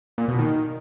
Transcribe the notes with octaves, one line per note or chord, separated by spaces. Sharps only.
A#2
B2
D#3